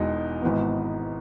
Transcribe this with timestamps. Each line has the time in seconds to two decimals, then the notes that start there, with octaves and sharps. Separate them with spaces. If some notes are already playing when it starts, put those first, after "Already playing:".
Already playing: E1 E2 B2 G#3 D#4
0.42 G#1 G#2 E3 B3